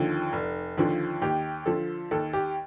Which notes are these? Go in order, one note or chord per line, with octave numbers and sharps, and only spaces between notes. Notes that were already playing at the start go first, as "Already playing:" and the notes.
Already playing: D#2 D3 F3
F1
D#2 D3 F3
D#2 G4
D3 F3 A4
D#2 A4
G4